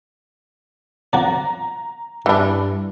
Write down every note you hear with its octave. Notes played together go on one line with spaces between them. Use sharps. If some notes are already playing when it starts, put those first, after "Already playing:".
F3 F#4 D5 A#5
G2 E3 D4